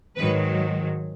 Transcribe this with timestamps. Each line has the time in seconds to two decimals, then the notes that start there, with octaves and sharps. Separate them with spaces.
0.16 G#2 D#3 F#3 B4